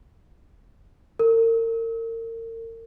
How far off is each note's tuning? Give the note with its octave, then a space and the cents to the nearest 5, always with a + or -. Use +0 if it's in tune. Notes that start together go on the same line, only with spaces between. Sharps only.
A#4 -35